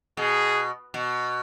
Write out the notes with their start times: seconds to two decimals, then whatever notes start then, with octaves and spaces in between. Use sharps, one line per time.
0.17 B2 G#4
0.94 B2